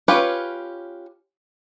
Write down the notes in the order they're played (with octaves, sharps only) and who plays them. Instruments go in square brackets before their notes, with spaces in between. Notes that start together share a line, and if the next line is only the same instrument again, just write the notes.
[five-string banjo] C#4 F4 G4 B4 C#5